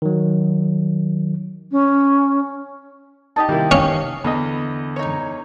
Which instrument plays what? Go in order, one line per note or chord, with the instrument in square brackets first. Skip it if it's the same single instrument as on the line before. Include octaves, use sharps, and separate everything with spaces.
[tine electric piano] D#3 F#3
[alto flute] C#4
[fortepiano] D#4 [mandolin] G4 D#5 A5
[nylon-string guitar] C3 D#3 [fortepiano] G3 A#3 E4
[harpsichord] C#4 [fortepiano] F5
[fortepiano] E2 D#5 [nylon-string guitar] D3 [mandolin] B5
[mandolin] D#4 C#5